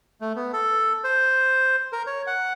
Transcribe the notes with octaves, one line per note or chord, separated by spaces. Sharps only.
A3
B3
A4
C5
A#4
C#5
F#5